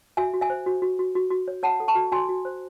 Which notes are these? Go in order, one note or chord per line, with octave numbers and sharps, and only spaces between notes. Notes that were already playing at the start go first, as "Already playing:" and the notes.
F#4 E5 G#5
F#4
E5 G#5
C5
F#4
F#4
F#4
F#4
F#4
C#5
C#5 F#5 A5
A4
A5 C#6
F#4
F#4 G#5 C6
F#4
C5